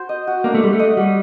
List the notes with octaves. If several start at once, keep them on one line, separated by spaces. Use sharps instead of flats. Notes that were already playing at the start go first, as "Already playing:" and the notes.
Already playing: F#4 C5
D#5
F#4
A#3 D4
A3
G3 C5
A3
D#5
G3 F#4